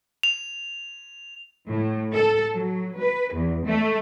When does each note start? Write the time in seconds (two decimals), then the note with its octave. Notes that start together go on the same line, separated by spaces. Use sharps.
0.23 F7
1.69 A2
2.13 A4
2.52 F#3
2.99 B4
3.33 E2
3.65 A3